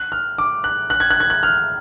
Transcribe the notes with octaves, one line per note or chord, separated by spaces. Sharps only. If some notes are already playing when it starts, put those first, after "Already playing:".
Already playing: F#6
F6
D6
F#6
F#6
G#6
F#6
G#6
F#6
F6